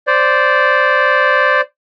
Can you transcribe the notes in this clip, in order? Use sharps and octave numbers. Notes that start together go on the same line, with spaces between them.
C5 D5